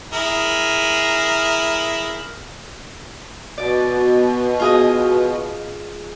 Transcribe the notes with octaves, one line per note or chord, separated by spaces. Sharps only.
E4 G#4 A#4
B2 D5
F4 G#4 D#5